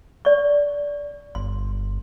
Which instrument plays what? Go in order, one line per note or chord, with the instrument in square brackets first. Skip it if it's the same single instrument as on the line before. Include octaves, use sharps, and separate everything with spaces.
[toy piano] D5 C#6
[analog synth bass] G1 [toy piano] C6